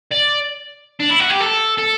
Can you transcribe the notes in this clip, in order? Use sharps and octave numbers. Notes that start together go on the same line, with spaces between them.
D5
D4
E4
F#4
G4
A4
A4